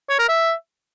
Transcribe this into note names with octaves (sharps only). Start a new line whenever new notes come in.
C#5
A#4
E5